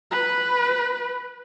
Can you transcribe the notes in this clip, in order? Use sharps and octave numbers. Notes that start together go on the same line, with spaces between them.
B4